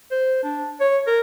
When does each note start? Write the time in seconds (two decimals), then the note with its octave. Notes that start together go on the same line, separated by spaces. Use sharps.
0.11 C5
0.44 D4
0.81 C#5
1.07 A#4